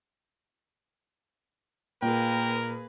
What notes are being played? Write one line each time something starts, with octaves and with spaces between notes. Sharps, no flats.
A#2 A#3 G#4 A#4 B4 G5